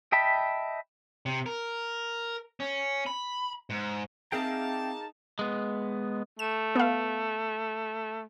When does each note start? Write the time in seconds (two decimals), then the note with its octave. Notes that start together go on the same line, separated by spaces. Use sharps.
0.12 D#5 E5 G5 A5 B5
1.26 C3
1.46 A#4
2.60 C#4
3.06 B5
3.70 G#2
4.32 A#3 C4 D#4 G#4 E5 F5 G5 A5
5.39 G#3 B3
6.39 A3 E7
6.76 B3 F5